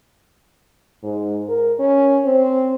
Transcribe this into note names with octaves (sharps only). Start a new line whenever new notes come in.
G#2
A#4
C#4
C4